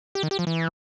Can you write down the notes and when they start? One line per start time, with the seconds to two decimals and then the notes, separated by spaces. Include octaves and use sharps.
0.15 G4
0.23 D#3
0.31 G4
0.39 F3
0.47 E3